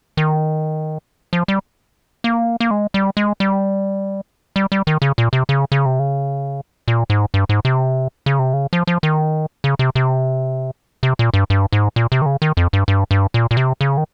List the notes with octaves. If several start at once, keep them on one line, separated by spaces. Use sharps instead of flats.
D#3
F3
G3
A#3
A#3
G#3
G3
G#3
G3
G3
G3
D#3
C#3
A#2
C3
C#3
C#3
C3
C#3
A#2
G#2
G2
G#2
C3
C#3
C3
C#3
F3
F3
D#3
C#3
C3
C3
C3
A#2
G2
G2
G#2
A#2
C3
D#3
C#3
D#3
F2
G2
G2
G2
A#2
A#2
C3
C#3
D#3